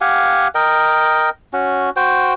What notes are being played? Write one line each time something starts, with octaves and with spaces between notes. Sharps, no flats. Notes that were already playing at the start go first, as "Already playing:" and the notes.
G4 F5 F#5 G#5
A#4 D#5 G5
C#4 F#4
F#4 C5 G5